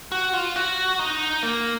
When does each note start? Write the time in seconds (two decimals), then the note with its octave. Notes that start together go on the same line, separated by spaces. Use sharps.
0.12 F#4
0.34 F4
0.56 F#4
0.99 D#4
1.43 A#3